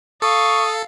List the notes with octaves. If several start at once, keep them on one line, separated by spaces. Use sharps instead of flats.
A4 F5 C#6 D#6